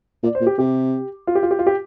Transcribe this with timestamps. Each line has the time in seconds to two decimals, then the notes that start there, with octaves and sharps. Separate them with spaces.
0.23 A#2 D5
0.35 C5
0.41 A#2
0.47 G4
0.59 C3 G4
1.27 F4
1.35 G4
1.43 F4
1.51 G4
1.59 F4
1.67 G4